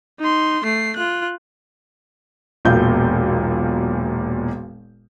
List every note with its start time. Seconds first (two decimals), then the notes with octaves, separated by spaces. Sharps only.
0.20 D#4 C6
0.64 A3 C7
0.96 F4 F#6
2.65 E1 B1 A#2 F5 G6